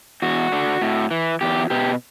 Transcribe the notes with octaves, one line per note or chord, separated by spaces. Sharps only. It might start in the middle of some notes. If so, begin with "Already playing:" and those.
E2 F#4
D3
A2
E3
E2 G4
B2 G4